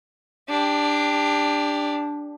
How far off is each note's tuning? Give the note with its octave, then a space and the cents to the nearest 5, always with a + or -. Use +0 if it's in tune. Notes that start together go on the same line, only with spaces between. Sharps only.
D4 +0 G4 +25